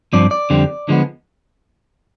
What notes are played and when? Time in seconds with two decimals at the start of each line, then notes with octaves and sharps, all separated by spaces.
0.13 G2 F3 C4 D5
0.31 D5
0.50 F2 D3 G3 C4
0.88 D3 F3 G#3 B3